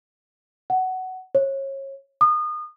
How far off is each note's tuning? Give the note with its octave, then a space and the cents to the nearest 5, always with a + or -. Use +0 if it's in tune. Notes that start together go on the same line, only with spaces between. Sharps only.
F#5 +15
C#5 -30
D#6 -30